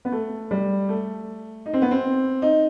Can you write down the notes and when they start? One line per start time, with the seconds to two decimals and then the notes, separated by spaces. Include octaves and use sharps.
0.05 B3
0.12 A3
0.51 G3
0.89 A3
1.66 D#4
1.74 C4
1.82 B3
1.91 C4
2.42 D#4